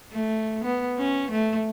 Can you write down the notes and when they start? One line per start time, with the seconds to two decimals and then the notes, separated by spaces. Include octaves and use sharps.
0.12 A3
0.64 B3
0.98 C#4
1.31 A3